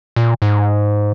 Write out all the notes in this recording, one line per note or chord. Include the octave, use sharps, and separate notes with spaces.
A#2
G#2